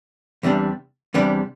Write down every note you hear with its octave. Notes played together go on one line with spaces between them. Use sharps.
E2 C3 G3 D4
E2 C3 G3 D4